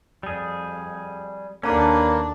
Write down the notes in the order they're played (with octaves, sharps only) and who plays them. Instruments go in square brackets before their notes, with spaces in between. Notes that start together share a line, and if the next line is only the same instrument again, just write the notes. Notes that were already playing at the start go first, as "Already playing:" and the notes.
[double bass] F2 [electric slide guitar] G3 G#4
[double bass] D#2 D4 [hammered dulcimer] D3 [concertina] A#3 [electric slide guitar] C#4 B4